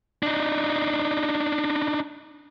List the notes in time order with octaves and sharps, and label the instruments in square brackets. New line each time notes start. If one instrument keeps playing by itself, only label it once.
[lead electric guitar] D4 D#4